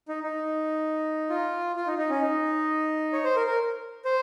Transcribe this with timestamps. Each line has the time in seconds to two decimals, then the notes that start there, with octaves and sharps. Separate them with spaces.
0.08 D#4
0.23 D#4
1.30 F4
1.76 F4
1.87 D#4
1.98 D#4
2.10 C#4
2.21 D#4
3.13 C#5
3.24 C5
3.36 A#4
3.47 A#4
4.05 C5